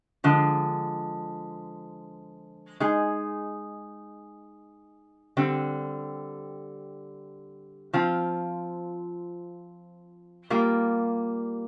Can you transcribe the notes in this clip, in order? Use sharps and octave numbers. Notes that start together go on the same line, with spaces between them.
D3 F3 G#3
G#3 D#4 G#4
D3 G3 C4
F3 C4 F4
G3 A#3 F4